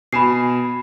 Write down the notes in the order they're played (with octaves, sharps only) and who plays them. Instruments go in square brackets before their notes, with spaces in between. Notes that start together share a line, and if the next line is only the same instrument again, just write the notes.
[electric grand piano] B2 G#5 E7 [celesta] B5 C7